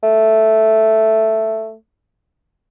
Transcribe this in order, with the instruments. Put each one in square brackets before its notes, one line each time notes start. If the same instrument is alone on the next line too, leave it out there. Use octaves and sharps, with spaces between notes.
[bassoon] A3